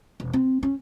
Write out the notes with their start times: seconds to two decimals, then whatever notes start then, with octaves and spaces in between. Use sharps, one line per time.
0.20 E1
0.33 C4
0.63 C#4